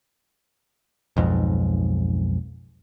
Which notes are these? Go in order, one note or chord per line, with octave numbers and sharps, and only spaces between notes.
B1 F2 G#2